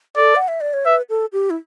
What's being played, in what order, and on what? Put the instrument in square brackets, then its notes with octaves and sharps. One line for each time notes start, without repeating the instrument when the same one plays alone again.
[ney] A4 [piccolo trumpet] D5
[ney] F#5
E5
D5
C#5
[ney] B4 [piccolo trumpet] E5
[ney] A4
G4
E4